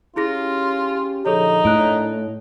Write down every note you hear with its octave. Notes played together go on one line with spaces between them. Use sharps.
C#4 E4 F4 G4 G#4 A#6
A#2 D3 F3 D#4 G#4 A4 C#5
A2 A#3 D4 C#5 F#6 D7